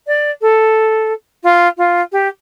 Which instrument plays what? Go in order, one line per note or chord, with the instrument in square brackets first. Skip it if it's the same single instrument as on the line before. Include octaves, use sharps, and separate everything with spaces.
[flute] D5
A4
F4
F4
G4